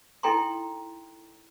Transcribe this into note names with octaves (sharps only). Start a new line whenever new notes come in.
D#4 E4 A4 G5 A#5 C6